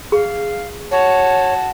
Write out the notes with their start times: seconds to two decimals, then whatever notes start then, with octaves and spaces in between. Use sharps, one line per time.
0.12 G#4 F5 C#6
0.91 F#4 C#5 A5